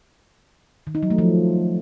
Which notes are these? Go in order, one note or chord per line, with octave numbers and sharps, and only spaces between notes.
D#3
D#4
F#3
A3
F3